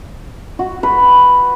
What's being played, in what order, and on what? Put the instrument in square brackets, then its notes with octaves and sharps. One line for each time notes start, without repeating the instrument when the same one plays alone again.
[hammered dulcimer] F#4
B4